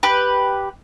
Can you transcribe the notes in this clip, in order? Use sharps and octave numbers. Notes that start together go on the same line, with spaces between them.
G4 B4